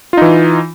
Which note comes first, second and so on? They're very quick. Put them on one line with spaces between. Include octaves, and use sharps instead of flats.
F4 D#4 E3